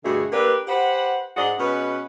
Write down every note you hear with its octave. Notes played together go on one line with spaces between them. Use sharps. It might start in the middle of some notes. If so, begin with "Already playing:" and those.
G2 B2 D3 A3 F#4 G#4
A#3 D4 G4 A4 B4
G4 B4 C5 F#5
G#2 D4 G#4 D5 D#5 F#5
B2 G#3 C#4 B4